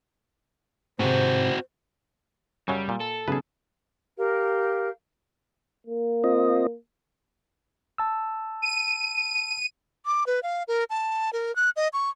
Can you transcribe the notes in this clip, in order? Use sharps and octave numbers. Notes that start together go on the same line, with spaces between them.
G#2 C3 C4 F#4 C5
F#2 C#3 F#3 G3
A#2
A4
B1 C#3 G#4 B4
G4 A#4 F5
A#3
C4 F4 D#5
A5 E6
D#7
D6
B4
F5
A#4
A5
A#4
F#6
D#5
C#6